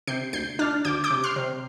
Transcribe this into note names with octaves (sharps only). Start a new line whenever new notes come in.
C3 G6 C7
D2 G6 C7
D4 F6 A6
D2 D6 G6
D6 G6
C3
C6 F6
C3